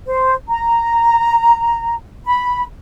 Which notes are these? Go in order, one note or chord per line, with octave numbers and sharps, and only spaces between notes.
C5
A#5
B5